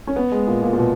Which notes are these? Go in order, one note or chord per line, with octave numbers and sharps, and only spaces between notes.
C#4
B3
G#3
A#2
A#2
A#2
B2